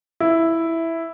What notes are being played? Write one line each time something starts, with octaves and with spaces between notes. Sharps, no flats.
E4